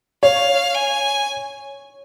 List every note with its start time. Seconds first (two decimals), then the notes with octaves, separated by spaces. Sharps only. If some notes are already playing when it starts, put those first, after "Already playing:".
0.23 C#5 F5
0.75 G#5